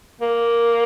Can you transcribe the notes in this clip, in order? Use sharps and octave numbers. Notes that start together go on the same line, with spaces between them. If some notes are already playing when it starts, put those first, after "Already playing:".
A#3